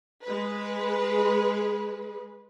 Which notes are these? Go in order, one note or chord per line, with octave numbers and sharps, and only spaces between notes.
G#3 B4